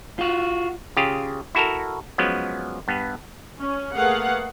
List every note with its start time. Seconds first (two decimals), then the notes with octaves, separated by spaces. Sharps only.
0.19 F4 F#4
0.97 C#3 F4 G4 G#4
1.55 E4 F#4 A4 A#4
2.18 F3 F#3 G#3 B3 C#4
2.88 G2 B3
3.58 C#4
3.95 A3 A#3 G#4 B4 F5 F#5